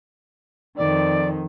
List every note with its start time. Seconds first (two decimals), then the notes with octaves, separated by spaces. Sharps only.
0.77 F2 D#3 D5